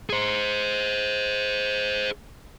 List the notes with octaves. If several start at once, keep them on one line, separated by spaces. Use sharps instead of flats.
G#4 C5